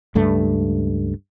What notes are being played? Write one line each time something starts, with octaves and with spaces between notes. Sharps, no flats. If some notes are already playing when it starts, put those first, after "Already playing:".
C#2 G2 A3